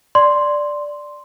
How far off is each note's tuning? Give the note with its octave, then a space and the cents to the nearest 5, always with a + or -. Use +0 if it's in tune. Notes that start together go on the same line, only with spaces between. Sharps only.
D5 +0 C6 +0